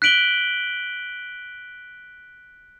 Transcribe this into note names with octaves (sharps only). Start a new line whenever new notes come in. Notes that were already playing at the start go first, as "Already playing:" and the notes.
F#6 B6 D7 F#7 G7